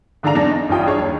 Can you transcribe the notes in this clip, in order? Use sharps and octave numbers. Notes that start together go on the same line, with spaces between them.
G#2 D3 D4 F5 A#5 F7
E2 D4 A5 A#6
D#4
A1 G2 E4 F4 G5 D#6
D4 D#4 G#4 C#5
D#2